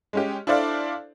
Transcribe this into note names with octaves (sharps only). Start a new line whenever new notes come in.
G#3 C#4 G4
D4 E4 A4 C5 D5 F5